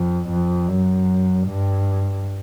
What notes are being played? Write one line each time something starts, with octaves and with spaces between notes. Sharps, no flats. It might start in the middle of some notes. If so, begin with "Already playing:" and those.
Already playing: F2
F2
F#2
G2